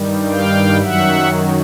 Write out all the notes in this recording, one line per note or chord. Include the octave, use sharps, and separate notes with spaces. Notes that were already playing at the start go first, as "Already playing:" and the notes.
Already playing: G2 D#3 G3
F5 G5
F#2 D#3 F#3 E5 F#5